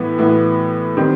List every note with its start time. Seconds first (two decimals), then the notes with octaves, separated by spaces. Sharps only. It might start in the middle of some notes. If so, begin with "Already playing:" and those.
Already playing: A2 E3 B3 B4
0.18 A2 E3 B3
0.96 D#3 G3 C4